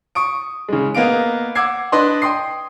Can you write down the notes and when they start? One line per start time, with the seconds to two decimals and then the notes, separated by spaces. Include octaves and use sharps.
0.15 C#6 D#6 D7
0.69 C#3 G#3
0.95 A#3 B3 D#5 F5 D7
1.55 F#5 D6 E6 G#6 C7
1.92 D4 B4 D#5 C6
2.22 G5 C6 D#6 C7